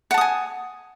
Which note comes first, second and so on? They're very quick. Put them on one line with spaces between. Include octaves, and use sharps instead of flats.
F#5 A5 D#6 G#5